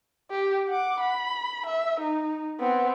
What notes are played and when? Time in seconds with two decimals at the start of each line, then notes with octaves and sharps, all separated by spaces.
0.31 G4
0.69 F#5 D6
1.00 B5
1.66 E5
2.00 D#4
2.60 B3 C4